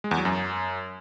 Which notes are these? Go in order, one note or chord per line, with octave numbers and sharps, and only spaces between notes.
G#3
E2
F#3
F#2